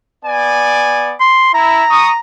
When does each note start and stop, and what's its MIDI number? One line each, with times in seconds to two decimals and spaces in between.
0.24 1.15 59
0.24 1.15 74
0.24 1.15 80
1.20 1.54 84
1.54 1.84 64
1.54 2.19 82
1.90 2.09 85
1.90 2.09 87